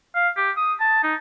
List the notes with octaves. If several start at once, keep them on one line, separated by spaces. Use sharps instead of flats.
F5
G4
D#6
A5
D#4